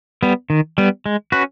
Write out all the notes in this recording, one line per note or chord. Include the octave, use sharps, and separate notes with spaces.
G3 B3
D#3
G3 B3
G#3
C#4 F#4 B4